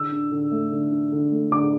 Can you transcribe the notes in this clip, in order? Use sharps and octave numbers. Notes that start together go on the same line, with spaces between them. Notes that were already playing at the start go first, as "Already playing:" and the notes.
Already playing: D3 E6
D4
D3
A3
D3
D4
D3
A3
D3 D6